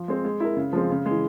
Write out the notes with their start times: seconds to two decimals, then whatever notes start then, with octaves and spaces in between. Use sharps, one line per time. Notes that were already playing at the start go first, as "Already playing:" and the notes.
Already playing: F3
0.08 G#3 C4
0.25 G#3
0.40 E4 A#4
0.57 C#3
0.73 F3 G#3 C4
0.90 C#3
1.06 G#3
1.11 E3